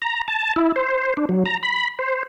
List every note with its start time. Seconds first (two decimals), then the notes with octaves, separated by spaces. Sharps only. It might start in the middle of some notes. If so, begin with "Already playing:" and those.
0.02 A#5
0.28 A5
0.56 E4
0.76 C5
1.17 D4
1.29 F#3
1.46 A#5
1.63 B5
1.99 C5